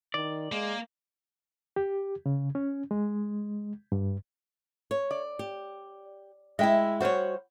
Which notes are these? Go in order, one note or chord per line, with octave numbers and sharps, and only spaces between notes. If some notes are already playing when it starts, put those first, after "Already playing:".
D#3 D5
G#3 A#3
G4
C#3
C#4
G#3
G2
C#5
D5
G4
G#3 E4 D#5 E5 G5
G3 F#4 C5 C#5 F#5